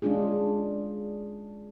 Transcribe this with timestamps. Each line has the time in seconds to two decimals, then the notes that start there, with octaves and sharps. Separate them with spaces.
0.02 G#3 C#4 D4 F4 G#4